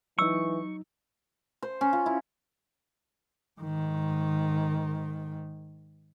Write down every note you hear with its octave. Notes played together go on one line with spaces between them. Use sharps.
E3 F#3 D#4 C#6 E6
C5
C#4
F4
E4
G#2 D#3